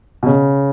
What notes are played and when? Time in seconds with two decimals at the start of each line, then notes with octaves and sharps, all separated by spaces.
0.23 B2
0.26 C#3